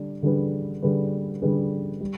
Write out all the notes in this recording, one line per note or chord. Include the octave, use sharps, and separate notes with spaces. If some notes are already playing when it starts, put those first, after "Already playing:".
Already playing: D3 G3 D4
D3 G3 D4 G#4 B4
D3 G3 D4 G#4 B4
D3 G3 D4 G#4 B4
G3